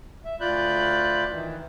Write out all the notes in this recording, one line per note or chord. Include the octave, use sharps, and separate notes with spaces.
E5
D2 F4 D5 B5 F#6 G6
D#3 E3